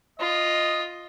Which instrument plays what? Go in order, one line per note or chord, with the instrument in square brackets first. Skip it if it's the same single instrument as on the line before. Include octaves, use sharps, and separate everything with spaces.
[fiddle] F4 [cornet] D#5